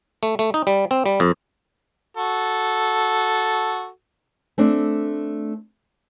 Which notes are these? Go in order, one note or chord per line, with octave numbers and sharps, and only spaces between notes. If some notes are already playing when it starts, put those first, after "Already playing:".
A3
A3
D#4
G3
C4
G3
F2
F#4 A4
A3 C4 D4